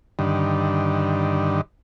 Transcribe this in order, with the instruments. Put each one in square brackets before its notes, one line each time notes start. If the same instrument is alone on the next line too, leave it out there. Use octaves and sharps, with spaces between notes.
[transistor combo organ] G2 D3 D#3